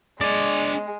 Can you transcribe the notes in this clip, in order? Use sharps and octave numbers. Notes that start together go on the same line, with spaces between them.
G#3 D4 D5 G#5